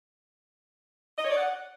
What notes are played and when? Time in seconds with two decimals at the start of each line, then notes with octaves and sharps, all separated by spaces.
1.18 D#5
1.24 C#5
1.30 D5
1.36 F#5